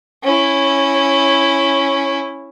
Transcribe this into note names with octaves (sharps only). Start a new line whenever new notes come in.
C#4 E4